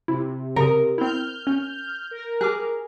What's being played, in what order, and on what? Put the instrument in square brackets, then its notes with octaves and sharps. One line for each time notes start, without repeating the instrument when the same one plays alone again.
[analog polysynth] C3 [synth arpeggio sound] E4
[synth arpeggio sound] C#3 D#6 [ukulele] A#4
[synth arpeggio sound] C4 E4 [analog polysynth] F6 G6
[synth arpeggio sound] C#4
[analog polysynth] A#4
[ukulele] G#4 [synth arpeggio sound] D6 F6 F#6